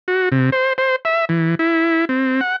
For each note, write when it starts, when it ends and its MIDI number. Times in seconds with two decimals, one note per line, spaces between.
0.08 0.29 66
0.32 0.50 48
0.52 0.73 72
0.78 0.96 72
1.05 1.25 76
1.29 1.55 52
1.59 2.05 64
2.09 2.41 60
2.41 2.56 78